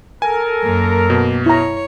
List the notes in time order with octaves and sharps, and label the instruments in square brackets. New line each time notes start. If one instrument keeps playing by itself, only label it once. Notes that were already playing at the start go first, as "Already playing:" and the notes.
[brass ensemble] A4 A#4 [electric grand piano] G#5
[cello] F#2 A#3
[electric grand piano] B2
[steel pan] E4 A#5 [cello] C#5